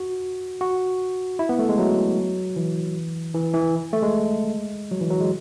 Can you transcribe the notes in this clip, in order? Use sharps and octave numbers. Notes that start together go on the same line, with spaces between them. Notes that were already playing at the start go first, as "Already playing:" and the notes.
Already playing: F#4
F#4
E4
B3
A3
G#3
F#3
E3
E3
E3
A3
G#3
F#3
E3
F#3
G#3